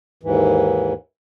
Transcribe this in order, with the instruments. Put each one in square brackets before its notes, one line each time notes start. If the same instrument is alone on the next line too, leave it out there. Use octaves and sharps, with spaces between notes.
[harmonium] D#2 G#2 E3